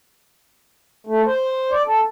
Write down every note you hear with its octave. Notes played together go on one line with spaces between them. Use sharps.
A3
C5
D5
A4